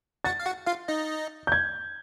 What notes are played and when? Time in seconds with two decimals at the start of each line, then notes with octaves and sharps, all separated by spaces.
0.24 F#4 F#5 A6
0.40 F5
0.46 F#4 F#5
0.66 F4 F5
0.88 D#4 D#5
1.47 G6
1.52 G#6